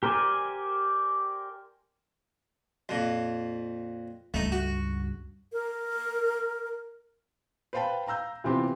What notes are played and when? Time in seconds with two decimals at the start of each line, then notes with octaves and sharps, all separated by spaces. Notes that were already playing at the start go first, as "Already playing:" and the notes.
0.03 G4 A#4 C5 D5 G#5
2.89 F2 A#2
4.34 C#2 G2 A3 D#4
4.52 F#4
5.53 A#4
7.73 B4 C5 F5 G5 A5 B5
8.07 F5 A#5 E6 G6
8.44 C3 E3 B3 C4 F4 G4